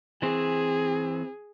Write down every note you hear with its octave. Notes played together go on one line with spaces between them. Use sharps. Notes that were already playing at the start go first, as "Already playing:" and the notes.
E3 C4 G#4